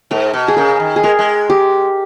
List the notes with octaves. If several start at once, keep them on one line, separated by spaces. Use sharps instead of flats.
G#2 A#4
B2
G#4
C#3 A#4
D#3
G#4
G#3 A#4
G#3
G4